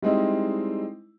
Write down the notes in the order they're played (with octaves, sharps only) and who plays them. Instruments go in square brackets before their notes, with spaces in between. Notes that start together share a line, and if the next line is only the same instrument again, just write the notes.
[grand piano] G3 G#3 C4 D#4 E4